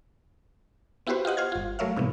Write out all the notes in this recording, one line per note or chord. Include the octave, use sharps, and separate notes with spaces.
B3 E4 F#4 G4 B4 C5
F4 G4 D#5 F#5
C5 F6 G#6
G1 F4
F#3 A3 A#4 C#5 E5 F5
G#2 C3 E3 B3